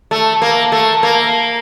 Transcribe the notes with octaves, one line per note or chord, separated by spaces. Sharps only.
A3
A#3
A3
A#3